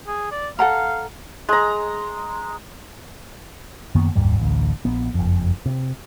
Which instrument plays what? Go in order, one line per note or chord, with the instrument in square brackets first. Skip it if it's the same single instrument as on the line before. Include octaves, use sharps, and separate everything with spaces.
[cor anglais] G#4
D5
[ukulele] A4 F#5 A#5 [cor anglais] F5
[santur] G#3 A#5
[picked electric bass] F#2 D#3 A#3 B3
F#1 D#2 G#2 G3
A1 D2
A#1 B3
F#1 F2
C3